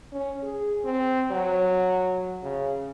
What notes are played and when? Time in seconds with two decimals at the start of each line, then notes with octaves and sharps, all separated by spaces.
0.12 C#4
0.43 G#4
0.85 C4
1.31 F#3
2.43 C#3